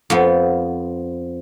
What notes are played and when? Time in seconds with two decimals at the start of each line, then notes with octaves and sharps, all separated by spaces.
0.10 F2 F3 B3